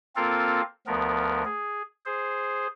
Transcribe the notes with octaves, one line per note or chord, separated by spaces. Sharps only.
A#3 C4 F4 A4 A#4 F5
D2 F3 B3 A#4
G#4
G#4 C5